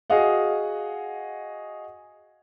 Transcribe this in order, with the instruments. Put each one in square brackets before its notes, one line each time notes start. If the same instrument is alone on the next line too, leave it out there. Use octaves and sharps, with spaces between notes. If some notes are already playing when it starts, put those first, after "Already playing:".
[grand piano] F#4 G#4 D#5 F5 F#5